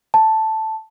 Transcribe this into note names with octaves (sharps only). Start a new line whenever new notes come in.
A5